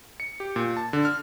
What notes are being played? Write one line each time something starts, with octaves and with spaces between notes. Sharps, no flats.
C#7
G4
A#2
A5
D3
F6